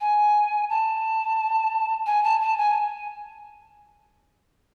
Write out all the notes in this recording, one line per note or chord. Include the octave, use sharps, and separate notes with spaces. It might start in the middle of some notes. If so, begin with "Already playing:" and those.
G#5
A5
G#5
A5
A5
G#5